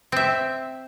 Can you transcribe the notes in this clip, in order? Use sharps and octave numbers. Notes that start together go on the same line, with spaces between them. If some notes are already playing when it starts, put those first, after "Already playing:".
C4 E5